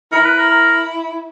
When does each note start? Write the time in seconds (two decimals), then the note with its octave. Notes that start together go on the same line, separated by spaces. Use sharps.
0.12 E4 A#4
0.24 B4
0.37 A#4
0.50 A#4